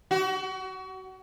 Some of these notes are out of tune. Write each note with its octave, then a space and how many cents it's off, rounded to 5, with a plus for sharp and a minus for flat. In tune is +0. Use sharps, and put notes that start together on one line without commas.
F#4 +30